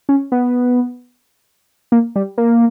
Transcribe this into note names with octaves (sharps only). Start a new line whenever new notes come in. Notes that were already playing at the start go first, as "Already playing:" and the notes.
C#4
B3
A#3
G3
A#3